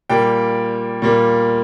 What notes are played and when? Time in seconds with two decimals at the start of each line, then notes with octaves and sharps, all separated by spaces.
0.10 A#2 G3 A#3 G5
1.02 A#2 G3 A#3